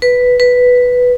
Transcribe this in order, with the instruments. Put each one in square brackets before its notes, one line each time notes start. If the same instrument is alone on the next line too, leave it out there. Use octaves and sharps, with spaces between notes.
[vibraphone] B4
B4